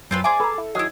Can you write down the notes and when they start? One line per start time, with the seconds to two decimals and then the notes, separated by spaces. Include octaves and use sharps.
0.11 F#2 C4 F4 B4
0.24 G#4 C5 D5 E5 G#5 D6
0.40 A4 B4 A#5
0.58 E4
0.75 D#3 F#3 E4 G#4 D#5